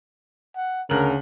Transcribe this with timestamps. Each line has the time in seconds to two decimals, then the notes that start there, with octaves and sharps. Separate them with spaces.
0.56 F#5
0.90 D2 C#3 A#4 F#7